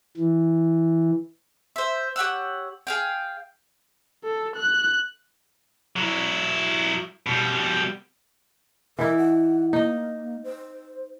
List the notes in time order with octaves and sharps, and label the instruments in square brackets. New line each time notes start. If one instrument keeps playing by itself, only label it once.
[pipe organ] E3
[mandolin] C5 E5
G4 C#5 F#5 E6
G#4 F5 G5
[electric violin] A4
F#6
[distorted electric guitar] F#3 E4
B2 G3
[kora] E3 D#4 E4 [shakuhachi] A#4
[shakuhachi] F#5
[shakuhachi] A#3 [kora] D#4 D#5
[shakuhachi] C5